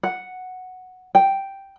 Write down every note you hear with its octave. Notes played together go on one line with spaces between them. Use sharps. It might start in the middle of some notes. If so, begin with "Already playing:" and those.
F#5
G5